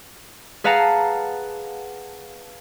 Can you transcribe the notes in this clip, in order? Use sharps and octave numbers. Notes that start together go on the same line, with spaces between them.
G#4 B4 F5 F#5 A5 A#5